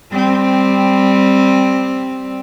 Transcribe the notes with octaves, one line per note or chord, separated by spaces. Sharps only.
G3 C4